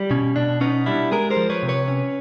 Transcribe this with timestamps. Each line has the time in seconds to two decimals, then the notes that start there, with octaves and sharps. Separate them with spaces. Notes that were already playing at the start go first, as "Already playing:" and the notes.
Already playing: G3
0.11 B2 C#4
0.36 B2 D4
0.61 B3 C#4 D#4
0.86 G3 D4 E4
1.12 G#3 G#4 A#4
1.31 A#4 C5
1.37 F3
1.50 B4 C#5
1.63 C3
1.69 B4 C#5
1.88 C#4